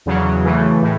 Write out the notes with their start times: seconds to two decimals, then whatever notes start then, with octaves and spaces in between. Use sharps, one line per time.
0.06 E2 C#3 F#3
0.44 C#3 E3 A3
0.83 A2